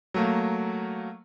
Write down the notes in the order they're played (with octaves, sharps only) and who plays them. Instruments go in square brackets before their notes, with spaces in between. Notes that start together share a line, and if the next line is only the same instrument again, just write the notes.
[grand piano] F#3 A3 A#3